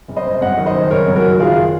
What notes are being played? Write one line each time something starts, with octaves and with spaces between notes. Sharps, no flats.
F#1
C5 D#5
F#1
F#2 D#5 F#5
D#3
C5 D#5
F#1
F#1 A#4 C#5
F#2
F#4 A#4
D#3
F#1 F4 G#4